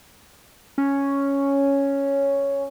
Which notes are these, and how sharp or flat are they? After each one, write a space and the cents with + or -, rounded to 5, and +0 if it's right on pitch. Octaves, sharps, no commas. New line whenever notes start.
C#4 +0